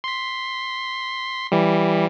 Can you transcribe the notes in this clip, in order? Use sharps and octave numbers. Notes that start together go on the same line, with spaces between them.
C6 B6
E3 G3